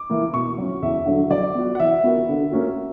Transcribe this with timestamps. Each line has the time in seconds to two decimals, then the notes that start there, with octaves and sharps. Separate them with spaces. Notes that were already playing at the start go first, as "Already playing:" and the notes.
Already playing: D6
0.10 E3 A#3 E4
0.33 B2 C#6
0.58 F#3 C#4
0.82 E2 E5
1.06 D3 F#3
1.31 F#3 D5
1.55 B3 F#4
1.75 F#5
1.80 E3 E5
2.04 B3 F#4 A#4
2.29 D3
2.52 A#3 C#4 F#4